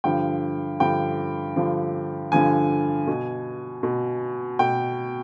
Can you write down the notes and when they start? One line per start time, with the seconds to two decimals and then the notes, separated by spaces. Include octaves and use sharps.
0.04 G2 D3 F3 G5
0.80 G2 D3 F3 G5
1.56 G2 D3 F3
2.32 G2 D3 F3 G#5
3.07 B2
3.83 B2
4.59 B2 G5